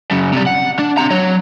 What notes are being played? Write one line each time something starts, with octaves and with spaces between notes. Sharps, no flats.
F#2 C#3
C3 G3
F#5
D4
C4 A#5
F#3 C#5